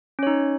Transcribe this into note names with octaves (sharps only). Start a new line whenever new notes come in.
C#4 D#4 C#5